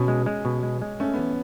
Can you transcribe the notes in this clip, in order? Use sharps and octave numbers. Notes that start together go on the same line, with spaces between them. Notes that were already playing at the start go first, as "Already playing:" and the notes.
Already playing: B2 C#4
G#3
G#3
B2
G#3
G#3
A3 C#4
E3 B3